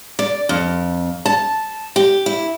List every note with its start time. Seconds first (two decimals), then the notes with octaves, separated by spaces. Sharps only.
0.19 D5
0.49 F2
1.26 A5
1.96 G4
2.26 E4